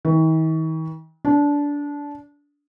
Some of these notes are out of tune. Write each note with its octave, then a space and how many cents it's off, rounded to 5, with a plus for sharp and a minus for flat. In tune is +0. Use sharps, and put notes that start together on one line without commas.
D#3 +45
D4 -20